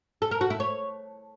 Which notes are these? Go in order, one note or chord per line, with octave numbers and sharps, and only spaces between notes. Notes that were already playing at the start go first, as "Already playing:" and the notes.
A4
A#4
F#4
E4
C#5